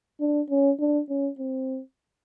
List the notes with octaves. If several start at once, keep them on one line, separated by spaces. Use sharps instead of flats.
D4
C#4
D4
C#4
C4